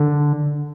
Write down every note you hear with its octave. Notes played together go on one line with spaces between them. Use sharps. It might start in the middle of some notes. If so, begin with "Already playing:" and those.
Already playing: D3